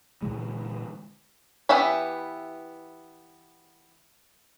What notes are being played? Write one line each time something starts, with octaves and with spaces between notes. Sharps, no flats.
A#2 D3 E3 G#3
E3 B3 G4 E5 B5